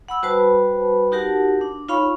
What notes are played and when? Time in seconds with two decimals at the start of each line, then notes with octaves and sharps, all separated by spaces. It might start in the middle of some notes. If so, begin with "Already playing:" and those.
0.09 F#5 B5 E6
0.23 G3 F#4 B4 C5 A5 B5
1.12 D#4 F#4 G4 A#4 F#5 A5
1.61 D4
1.88 D#4 F4 C#5 F5 B5 C#6